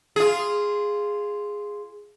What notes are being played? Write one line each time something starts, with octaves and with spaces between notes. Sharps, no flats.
F4 G#4